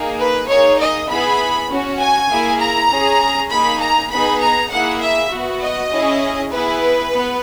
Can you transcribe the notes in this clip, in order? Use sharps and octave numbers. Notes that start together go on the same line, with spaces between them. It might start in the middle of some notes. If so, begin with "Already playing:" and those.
Already playing: A#3 D#4 G#4
B4
A#3 D#4 G#4 C#5
D#5
B3 E4 G#4 B5
C#4 F#4
G#5
A#3 E4 G#4
A#5
C#4 G#4
A#3 D#4 G#4 B5
A#5
B3 D#4 G#4 B5
A#5
A#3 E4 G#4 F#5
E5
B3 F#4
D#5
C#4 E4 G#4
B3 E4 G#4 B4
B3